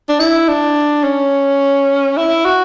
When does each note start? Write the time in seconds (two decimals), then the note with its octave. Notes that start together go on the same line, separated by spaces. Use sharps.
0.09 D4
0.20 E4
0.48 D4
1.04 C#4
2.17 E4
2.45 F#4